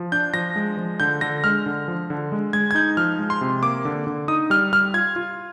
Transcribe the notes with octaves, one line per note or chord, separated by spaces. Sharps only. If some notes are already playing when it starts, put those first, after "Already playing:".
Already playing: F3
D4 G6
F3 A#6
G#3
F3
D3 G6
D3 A#6
G#3 F6
D3
F3
D3
G#3
G#3 G#6
G#6
D#4 G6
F3 F6
G#3
C6
C3
A#3 D6
D3
D3
D#4 D#6
G3 F6
G3 F6
F4 G#6
F4